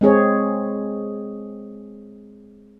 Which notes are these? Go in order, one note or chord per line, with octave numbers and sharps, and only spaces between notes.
G#3 C4 G#4 C#5